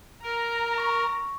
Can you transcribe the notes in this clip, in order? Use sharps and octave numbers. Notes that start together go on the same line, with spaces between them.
A#4 A#5
C#6 A#6